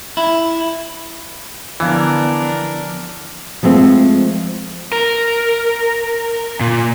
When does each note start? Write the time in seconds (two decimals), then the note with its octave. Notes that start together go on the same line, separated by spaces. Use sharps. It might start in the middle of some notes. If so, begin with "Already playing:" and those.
0.17 E4
1.80 D3 E3 F3 B3 D4 A#4
3.63 F3 G#3 A3 C4
4.92 A#4
6.60 A#2